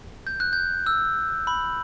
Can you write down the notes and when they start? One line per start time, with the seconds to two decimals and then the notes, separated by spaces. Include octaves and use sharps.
0.27 G6
0.40 F#6
0.53 G6
0.86 E6
1.47 B5